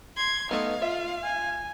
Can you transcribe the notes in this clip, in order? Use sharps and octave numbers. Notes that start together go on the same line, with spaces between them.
C6 G#6
A3 B3 D#4 F5
F4 E5
G#5